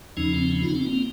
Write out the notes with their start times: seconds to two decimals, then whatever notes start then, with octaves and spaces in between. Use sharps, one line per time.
0.17 E2 C#3 F3 C#4 D#4
0.33 C4 D4
0.51 B3 C#4
0.62 D#4 F4
0.75 C4 D4
0.86 A#3 C4